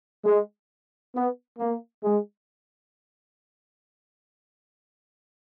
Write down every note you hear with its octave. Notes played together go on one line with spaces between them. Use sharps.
G#3
B3
A#3
G#3